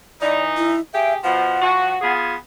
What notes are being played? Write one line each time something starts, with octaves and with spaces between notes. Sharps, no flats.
E3 D#4 D5
E4
G4 G#4 E5 G5
B2 F3 F#5
F3 F#4
B3 F4 G#4